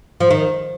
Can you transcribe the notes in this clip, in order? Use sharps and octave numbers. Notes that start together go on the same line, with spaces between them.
F3
D#3